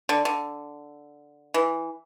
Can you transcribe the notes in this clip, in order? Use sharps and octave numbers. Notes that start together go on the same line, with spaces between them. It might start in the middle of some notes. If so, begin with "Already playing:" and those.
D3
D3
E3